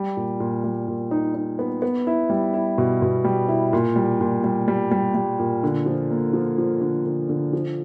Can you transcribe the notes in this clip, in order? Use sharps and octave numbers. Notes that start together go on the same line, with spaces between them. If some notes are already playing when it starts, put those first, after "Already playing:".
Already playing: G3
A#2
A#2
G3
A#2
D#4
D#4
B3
B3
E4
G3
E4
B2
B2
G3
E4
A#2
G3
A#2
G3
G3
G3
G3
A#2
D3
F3
A#3
F3
F3
D3
D3
D3
F3